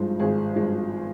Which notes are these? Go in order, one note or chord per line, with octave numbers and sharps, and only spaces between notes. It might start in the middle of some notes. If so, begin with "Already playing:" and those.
Already playing: G#1 G2 F3 G#3 C5
G#1 G#4
G2 F3 G#3